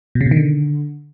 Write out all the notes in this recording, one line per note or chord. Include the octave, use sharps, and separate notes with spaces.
B2
C#3
B2
D#3
D3